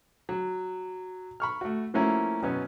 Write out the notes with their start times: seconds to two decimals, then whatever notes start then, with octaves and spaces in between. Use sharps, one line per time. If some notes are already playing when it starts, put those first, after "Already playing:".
0.29 F#3
1.40 B5 C#6 F6
1.61 A3 F#4
1.94 F3 A3 A#3 C#4 E4 F#4
2.43 F#2 B2 B3 C#4